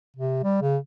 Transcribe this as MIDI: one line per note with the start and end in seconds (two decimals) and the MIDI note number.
0.16 0.39 48
0.43 0.60 55
0.61 0.77 49